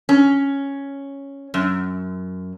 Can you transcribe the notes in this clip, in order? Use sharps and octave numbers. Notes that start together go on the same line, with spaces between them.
C#4
F#2